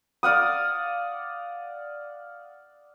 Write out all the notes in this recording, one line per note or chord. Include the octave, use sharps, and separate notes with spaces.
D5 F5 F#5 D#6